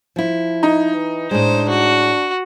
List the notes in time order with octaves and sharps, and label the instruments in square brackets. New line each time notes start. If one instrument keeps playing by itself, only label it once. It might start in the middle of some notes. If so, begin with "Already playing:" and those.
[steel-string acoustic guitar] F3 E4
[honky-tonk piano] D#4
[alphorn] E3
[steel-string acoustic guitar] A2 G#3 [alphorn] D4 [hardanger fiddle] C5
[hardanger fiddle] F#4